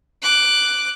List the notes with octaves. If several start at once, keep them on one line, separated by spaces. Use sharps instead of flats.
D6 F#6